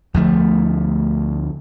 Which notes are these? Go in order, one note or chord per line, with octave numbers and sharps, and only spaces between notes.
D2 F3 A3